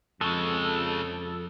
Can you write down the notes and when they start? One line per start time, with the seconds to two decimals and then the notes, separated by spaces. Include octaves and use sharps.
0.21 F2 C#3 G#3 A4